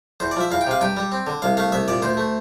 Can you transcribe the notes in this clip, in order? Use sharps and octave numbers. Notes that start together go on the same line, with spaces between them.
E2 C5
D5
F3 E5
E2 F5
G5
C3 F5
G2 G5
G3
C4
D3
C2 F5
A3 F5
C2 E5
A#2 D5
D2 C5
A3